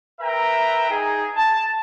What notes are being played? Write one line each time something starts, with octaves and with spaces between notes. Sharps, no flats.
A#4 B4 E5 G5 A#5
D#4 G#4
A5